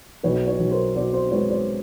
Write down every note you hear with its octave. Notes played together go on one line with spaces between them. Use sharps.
B1 B4 C#5
B4 C#5
B1
A#4 C5
B2 C5 D5
C5 D5
G#3 B4 C#5
C5 D5